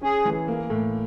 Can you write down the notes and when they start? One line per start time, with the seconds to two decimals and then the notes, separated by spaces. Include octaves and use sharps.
0.02 C#4 G#4
0.25 E3
0.48 A#3
0.70 A2